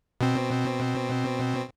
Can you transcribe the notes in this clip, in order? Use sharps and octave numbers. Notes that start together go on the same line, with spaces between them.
B2 C4